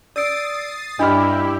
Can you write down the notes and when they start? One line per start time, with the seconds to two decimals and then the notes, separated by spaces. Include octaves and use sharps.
0.16 D5 D#6 E6 A6 C7 D7
0.99 G2 D4 E4 G4 D#5 B5 C6 F6